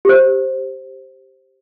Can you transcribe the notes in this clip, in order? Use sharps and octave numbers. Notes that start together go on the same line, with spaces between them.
G4 C5